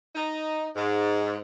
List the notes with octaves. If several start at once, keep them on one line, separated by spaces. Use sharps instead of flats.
D#4
G#2